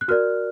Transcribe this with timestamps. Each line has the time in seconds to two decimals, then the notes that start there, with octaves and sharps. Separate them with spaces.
0.01 F#6
0.08 F#4 A#4 D5 F6